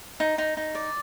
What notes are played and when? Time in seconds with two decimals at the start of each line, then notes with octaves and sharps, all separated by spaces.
0.20 D#4
0.38 D#4
0.57 D#4
0.75 D5